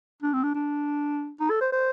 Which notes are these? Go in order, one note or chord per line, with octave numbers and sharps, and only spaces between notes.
D4
C4
D4
D4
D#4
A4
C5
C5